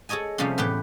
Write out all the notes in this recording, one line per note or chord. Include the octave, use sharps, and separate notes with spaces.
G#4 A4 C#5 D#5 G#5
C3 F3 G3 A3 C4 C#4
E2 A2 G4 B4 G5